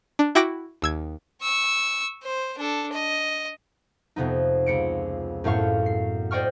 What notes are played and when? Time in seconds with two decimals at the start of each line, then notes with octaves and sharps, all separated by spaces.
0.19 D4
0.35 E4 F#4 G5 D6 A#6 D7
0.82 D#2 E6 G#6
1.41 C#6 E6
2.23 C5
2.59 D4 A4
2.92 D#5
4.16 F2 C3 B3 D#4
4.66 C#2 C#7 D7
5.44 F#2 A2 B3 F5 C#6
5.86 C7
6.31 C5 D5 D#5 G5 C#6 F6